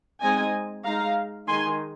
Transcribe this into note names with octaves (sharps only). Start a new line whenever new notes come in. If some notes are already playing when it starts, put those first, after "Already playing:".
G#3 C4 D#4 D#5 G#5
G#3 D#4 F5 A#5
D#3 G#3 D#4 G#5 C6